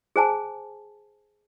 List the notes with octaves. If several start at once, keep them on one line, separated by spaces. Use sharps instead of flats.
G#4 C5 G#5 A5